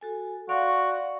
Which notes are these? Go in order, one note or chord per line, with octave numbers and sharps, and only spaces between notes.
F#4 A4 G#5
F#4 D5 F5 C6